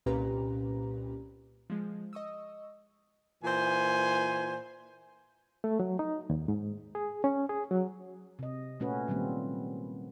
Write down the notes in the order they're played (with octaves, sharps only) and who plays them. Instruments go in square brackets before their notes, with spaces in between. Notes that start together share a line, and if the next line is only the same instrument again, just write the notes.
[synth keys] C2 A#2 C#4 G4 B4 A#5
F3 G#3
D#5 C#6 D#6 E6
[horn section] A#2 E3 C5 G#5
[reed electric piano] A3
F#3
D#4
D#2
G#2
G#4
C#4
G#4
F#3
[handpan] C3 D#5
A#2 A3 C#4 F#4 B4
A#2 D#3 F#3 G3 A#3 C4